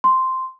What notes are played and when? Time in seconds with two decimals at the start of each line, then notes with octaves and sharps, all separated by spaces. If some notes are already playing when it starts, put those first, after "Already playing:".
0.04 C6